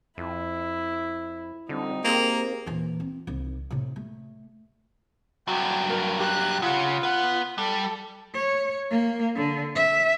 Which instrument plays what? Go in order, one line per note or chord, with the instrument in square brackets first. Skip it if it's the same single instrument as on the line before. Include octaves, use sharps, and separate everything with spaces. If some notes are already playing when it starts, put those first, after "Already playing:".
[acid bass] F2 [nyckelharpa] E4
[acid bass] D3 [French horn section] G3 C4 F4 [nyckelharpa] D#4
[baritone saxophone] A#3 [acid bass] C4 [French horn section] G4 G#4 A#4
[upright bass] D#1 E3
C4
C2 D#4
A2 C3
A3
[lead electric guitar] G2 F#3 [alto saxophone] F#4 [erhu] G5
[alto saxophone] A#4
[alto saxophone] G4 [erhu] F#6
[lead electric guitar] C#3 [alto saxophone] F4 [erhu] F#5
[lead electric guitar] B4 F#5 [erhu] F#6
[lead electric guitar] G3 [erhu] A4
[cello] C#5
A#3
D3
E5